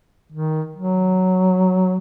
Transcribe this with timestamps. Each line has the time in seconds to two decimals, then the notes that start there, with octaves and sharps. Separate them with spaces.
0.32 D#3
0.76 F#3